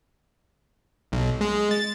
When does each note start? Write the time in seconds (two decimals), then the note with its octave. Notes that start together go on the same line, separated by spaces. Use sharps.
1.12 B1
1.41 G#3
1.71 A6